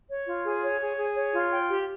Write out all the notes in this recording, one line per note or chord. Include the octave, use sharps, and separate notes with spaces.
C#5
F4
G#4
C#5
G#4
G#4
C#5
F4
G5
G4